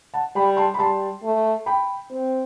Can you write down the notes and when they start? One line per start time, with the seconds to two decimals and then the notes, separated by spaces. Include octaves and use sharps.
0.14 F#5 A5
0.35 G3 G5 B5
0.57 A5 C6
0.74 B5
0.79 G3 A5 C6
1.23 A3
1.66 G5 B5
2.11 C4